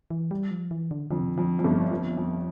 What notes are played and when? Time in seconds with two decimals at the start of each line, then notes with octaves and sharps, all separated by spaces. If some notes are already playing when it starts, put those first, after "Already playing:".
0.10 E3
0.31 G3
0.51 F3
0.71 E3
0.91 D3
1.11 F2 D3
1.20 C3
1.29 D3
1.38 F2
1.59 F2
1.64 G1 G2
1.91 F2
2.17 F2